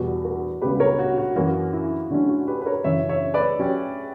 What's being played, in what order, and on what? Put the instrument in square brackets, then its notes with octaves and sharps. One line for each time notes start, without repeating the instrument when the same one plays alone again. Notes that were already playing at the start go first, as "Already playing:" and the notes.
Already playing: [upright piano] E2 B2 G3 [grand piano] F#4
[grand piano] F#4 A#4
[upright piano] C#2 C#3 G3 B3 [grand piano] G4 B4
[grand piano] A#4 C#5
F#4
F#4
[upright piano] F#2 E3 A#3 [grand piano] F#4
[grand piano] E4
[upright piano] D2 D3 F#3 C#4 [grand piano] F#4
[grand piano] F#4
G4 B4
B4
A#4 C#5
[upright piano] F#2 C#3 E3 [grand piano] C#5 E5
[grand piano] C#5 E5
B4 D5
[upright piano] F#3 C#4 G4 C#5